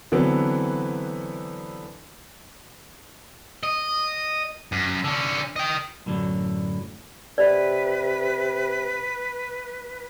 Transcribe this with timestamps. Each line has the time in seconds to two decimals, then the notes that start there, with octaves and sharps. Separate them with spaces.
0.12 D3 E3 F#3 B3 C4
3.63 D#5
4.72 F#2
5.04 D3 C#4
5.56 D#5 G5
6.06 F#2 A2 D3 F3 F#3
7.38 C3 B4 D5